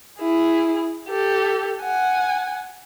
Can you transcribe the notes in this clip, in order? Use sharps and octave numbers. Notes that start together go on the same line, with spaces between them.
E4 G#4
G4 A4
F#5 G#5